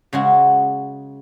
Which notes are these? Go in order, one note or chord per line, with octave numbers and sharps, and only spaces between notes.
C#3 G#3 F#4